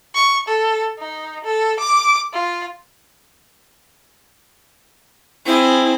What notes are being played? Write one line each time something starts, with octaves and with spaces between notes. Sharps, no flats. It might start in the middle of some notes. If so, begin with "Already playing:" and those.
C#6
A4
D#4
A4
D6
F4
C4 E4 G#4